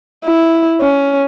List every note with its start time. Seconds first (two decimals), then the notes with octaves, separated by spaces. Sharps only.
0.24 E4
0.81 C#4